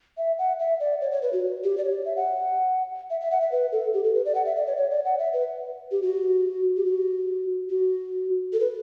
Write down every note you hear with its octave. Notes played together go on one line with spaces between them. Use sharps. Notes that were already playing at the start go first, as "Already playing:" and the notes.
E5
F#5
E5
D5
C#5
C#5
B4
F#4
G4
D5
C#5
E5
F#5
E5
E5
F#5
E5
B4
A4
G4
A4
B4
D5
F#5
E5
D5
C#5
C#5
D5
F#5
E5
B4
G4
F#4
G4
F#4
F#4
A4
B4